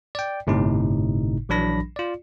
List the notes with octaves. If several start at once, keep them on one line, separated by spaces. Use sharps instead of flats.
D5 G5
G1 A2 C3 D#4
A#1 E3 F#3 D4 B5 A#6
F4 D5